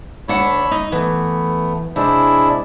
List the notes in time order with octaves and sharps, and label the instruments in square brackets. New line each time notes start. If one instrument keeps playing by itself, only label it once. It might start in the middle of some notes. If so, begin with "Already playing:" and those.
[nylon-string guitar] D2 D4 F#5 [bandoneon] C#5 E5 B5
[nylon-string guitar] D#4
[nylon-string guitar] E3 [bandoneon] A3 B3
[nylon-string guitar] C3 [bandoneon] G#3 D4 E4